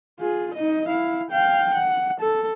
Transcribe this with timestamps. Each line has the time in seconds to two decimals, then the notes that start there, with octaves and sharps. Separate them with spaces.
0.20 F4 G#4
0.54 D#4 D#5
0.88 E4 F5
1.30 F5 G5
1.74 F#5
2.20 A4